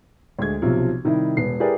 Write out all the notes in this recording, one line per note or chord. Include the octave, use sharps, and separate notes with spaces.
D2 G#3 G#6
B1 C3 F3
C3 D#3 G3 E4
E1 B3 C7
E4 G4 G#4 A#4 B4 D5